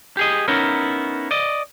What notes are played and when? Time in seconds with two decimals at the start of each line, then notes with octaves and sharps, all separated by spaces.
0.17 G4 G#4 D#5
0.48 B3 C#4 D#4 E4 A#4
1.31 D5 D#5